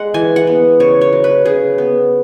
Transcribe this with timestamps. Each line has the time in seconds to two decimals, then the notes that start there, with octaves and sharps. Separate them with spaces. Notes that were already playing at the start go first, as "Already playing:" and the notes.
Already playing: G#3 F#5
0.14 E3 G#5
0.36 F#5
0.47 B3
0.80 C#3 C#5
1.01 C#5
1.13 F#3
1.24 B4
1.45 C#3 G#4
1.78 B3